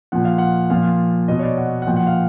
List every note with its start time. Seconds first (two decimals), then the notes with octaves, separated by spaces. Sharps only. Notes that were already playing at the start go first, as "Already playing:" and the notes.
0.12 A#2 F3 F#5
0.25 F5
0.38 F#5
0.70 A#2 F3 F5
1.28 B2 D#5
1.39 C#5
1.43 D5
1.57 F#5
1.82 F#5
1.87 A#2 F3 G5
1.96 F#5
2.07 F5